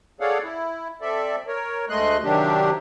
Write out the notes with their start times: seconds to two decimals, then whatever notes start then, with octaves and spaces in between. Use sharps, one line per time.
0.20 G#4 A4 C#5 D5 F5 F#5
0.44 E4
1.01 C4 A4 D5 E5
1.47 A#4 C#5
1.89 D2 G#3 A3 D#5 C6 F#6
2.23 C3 D#3 F#3 D4 G4